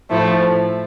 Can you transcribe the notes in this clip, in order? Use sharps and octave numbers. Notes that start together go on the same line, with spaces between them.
A2 F3 A3 E4